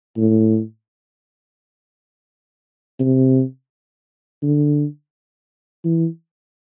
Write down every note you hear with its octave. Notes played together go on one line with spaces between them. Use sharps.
A2
C3
D3
E3